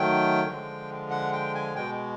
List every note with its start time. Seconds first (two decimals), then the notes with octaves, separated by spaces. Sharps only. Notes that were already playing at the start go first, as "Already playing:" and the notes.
Already playing: D#3 F#3 A3 G5
0.44 D3 F3 G#3
1.11 F#5
1.33 G5
1.55 G#5
1.76 B2 G#3 G5